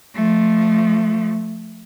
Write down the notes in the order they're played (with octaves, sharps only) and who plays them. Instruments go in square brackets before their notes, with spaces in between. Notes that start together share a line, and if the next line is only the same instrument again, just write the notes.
[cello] F3 A3